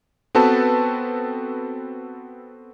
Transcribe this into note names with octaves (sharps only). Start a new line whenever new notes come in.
B3 C4 F#4 A4 B4 A5